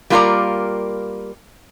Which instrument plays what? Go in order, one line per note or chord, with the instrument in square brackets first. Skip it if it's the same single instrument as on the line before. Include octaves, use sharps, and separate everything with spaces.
[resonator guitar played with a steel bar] G3 A#3 F4 G4 A#4 D5